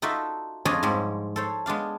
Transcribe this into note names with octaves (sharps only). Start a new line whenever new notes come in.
D#4 F4 F#4 A4 D5 E5
F2 D4 F4 G#4 C#5 D#5
G#2 F3 G3 G#3
A4 C5 C#5
G#3 B3 D4 F5